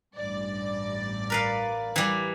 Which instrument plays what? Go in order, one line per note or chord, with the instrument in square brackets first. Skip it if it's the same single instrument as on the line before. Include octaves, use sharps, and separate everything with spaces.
[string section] A1 G2 D5
[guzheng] A#4 B4 F5
E3 G3